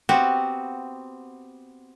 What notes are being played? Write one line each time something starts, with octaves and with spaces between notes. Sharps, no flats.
B3 C4 F#4 G4